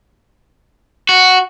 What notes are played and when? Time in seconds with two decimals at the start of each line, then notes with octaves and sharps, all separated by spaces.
1.09 F#4